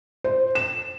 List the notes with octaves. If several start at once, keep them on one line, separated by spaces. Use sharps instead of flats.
C5
E7